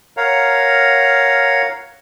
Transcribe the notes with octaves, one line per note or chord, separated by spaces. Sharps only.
A#4 C#5 F5 F#5 A#5